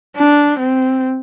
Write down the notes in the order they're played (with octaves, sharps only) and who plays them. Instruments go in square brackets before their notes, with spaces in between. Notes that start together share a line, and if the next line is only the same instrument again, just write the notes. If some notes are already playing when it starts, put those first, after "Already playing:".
[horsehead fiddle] D4
C4